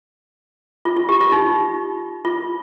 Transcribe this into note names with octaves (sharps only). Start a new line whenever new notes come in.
F4
F4
G4
F4
D#4
F4